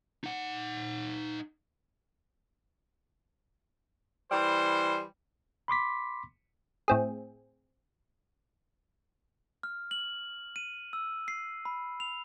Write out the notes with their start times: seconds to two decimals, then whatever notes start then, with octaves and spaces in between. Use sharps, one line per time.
0.24 D#4 F#5
4.31 E3 G3 C5
5.68 B5 C6 D6 B6
6.88 A2 C4 G#4
9.63 F6
9.91 F#7
10.56 D#7
10.93 E6
11.28 C7
11.65 B5
12.00 F7